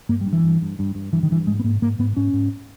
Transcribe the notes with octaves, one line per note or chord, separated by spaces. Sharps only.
G2 A#3
G3
G2
E3
G2
G2
G2
G2
G2 E3
D#3
G2 E3
G#2 G#3
B3
G#2 A#3
G#2 A#3
G#2 B3
G#2 C#4
G#2